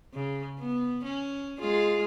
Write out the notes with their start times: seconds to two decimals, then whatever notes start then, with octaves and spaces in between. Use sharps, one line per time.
0.13 C#3
0.59 B3
1.04 C#4
1.60 G#3 F4 G#4